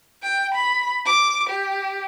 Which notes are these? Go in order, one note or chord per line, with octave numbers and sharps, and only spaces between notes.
G5
B5
D6
G4